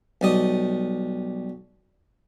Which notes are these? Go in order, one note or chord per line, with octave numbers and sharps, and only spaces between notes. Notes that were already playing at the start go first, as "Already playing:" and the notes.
B1 G3 D#5